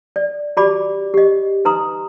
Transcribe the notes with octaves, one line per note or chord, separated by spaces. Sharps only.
D5
F#4 G4 D5 B5 D6
G4 D#5
D#4 B4 A#5 C6 D#6